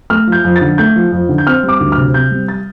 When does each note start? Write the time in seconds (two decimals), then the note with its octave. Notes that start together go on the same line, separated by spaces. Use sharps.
0.10 A3 F6
0.27 F3 G6
0.44 F2
0.56 A6
0.61 D3
0.78 A3 G6
0.96 F3
1.12 F2
1.29 D3
1.38 G6
1.47 C4 F6
1.63 G3
1.69 D6
1.80 D2
1.92 F6
1.98 C3
2.14 C4 G6
2.31 G3
2.48 A6